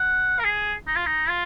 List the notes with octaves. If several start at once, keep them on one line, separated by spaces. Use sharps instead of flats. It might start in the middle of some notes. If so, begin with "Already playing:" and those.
Already playing: F#5
A#4
G#4
D#4
F4
D#4
F4